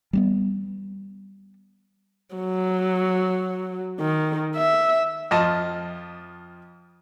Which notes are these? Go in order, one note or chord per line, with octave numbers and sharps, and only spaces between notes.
G3 A#3 B3
F#3
D#3
E5
F2 F4 D#5 A5